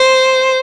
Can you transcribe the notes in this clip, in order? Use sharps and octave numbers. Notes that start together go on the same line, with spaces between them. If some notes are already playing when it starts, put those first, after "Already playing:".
Already playing: C5